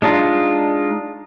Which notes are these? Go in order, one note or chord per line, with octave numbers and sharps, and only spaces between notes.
G#3 D4 D#4 F4